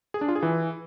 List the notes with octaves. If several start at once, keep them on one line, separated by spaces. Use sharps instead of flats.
G#4
D4
F4
G#4
E3